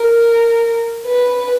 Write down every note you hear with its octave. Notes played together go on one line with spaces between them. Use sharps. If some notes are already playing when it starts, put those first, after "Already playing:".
Already playing: A#4
B4